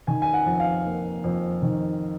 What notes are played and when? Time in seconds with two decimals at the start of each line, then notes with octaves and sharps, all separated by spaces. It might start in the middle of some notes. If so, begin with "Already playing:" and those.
0.07 D#3 G#5
0.22 G#5
0.34 F#5
0.46 F2
0.60 F5
0.85 A#3
1.24 F2
1.62 D#3